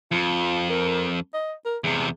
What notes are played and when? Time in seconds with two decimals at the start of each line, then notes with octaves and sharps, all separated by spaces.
0.12 F2 F4
0.70 A#4
1.34 D#5
1.65 A#4
1.84 E2 C3 G#4